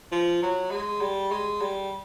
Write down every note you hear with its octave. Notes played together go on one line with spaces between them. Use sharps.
F3
F#3
G#3
G3
G#3
G3